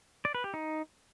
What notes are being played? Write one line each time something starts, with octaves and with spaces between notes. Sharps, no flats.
D5
B4
G4
D#4